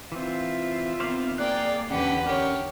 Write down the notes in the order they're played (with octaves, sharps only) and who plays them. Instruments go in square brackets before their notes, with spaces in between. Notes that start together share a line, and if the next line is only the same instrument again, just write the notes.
[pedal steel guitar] E3 C4 [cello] F4 E5
[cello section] D#3 B3 C4 [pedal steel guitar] C5 D5 F5
[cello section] A#3 G#4 D5 [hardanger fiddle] F5 G5 [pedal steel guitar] F#6
[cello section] E2 D3 D#3 [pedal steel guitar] C#4 [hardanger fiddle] G4 B4 [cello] F#5
[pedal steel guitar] C#4 A#4 [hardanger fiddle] G4 C#5